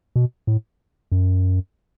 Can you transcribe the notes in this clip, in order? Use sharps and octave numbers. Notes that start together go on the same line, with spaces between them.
B2
A2
F#2